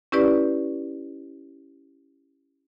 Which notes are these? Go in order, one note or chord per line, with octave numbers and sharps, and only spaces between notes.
C#4 E4 G4 B4 D5